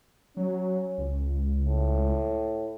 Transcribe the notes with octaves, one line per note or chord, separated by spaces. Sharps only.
F#3 C#4
C#2
A2